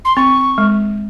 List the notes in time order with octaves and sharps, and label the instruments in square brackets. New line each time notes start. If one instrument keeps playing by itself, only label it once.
[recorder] C6
[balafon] C4 [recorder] C#6
[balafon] G#3